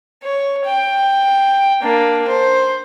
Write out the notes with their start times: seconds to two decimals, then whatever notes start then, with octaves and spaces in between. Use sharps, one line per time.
0.23 C#5
0.65 G5
1.82 A#3 D4
2.28 C5